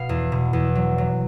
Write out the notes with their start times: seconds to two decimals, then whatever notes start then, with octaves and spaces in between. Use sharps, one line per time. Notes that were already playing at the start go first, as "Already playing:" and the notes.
Already playing: B2 F5
0.09 E2
0.32 B2
0.53 E2
0.75 F#3
0.98 F#3